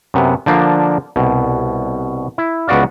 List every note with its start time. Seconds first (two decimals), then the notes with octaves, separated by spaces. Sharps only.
0.14 F#2 C3 B3
0.46 D3 F3 A#3 D4
1.16 C2 B2
2.38 E4
2.68 C#2 B3 F#4 D5 F5